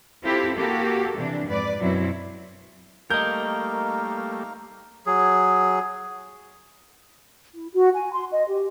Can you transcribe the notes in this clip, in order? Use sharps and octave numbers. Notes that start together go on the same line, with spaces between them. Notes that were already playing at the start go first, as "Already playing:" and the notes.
C4 E4 F4 G4 A4
A#3 F#4 G4 A4
C3 E3 D4
F2 G#2 B4 D5
F#2 B2 F#3 C4 E4
G3 A3 A#3 D#4 A#4 D#5 F5 G6
F#3 G#4
E4
F#4
G#5
C6
D#5
G4